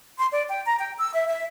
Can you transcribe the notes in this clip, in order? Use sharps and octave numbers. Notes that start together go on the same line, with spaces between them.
C6
D5
G5
A#5
G5
E6
E5
E5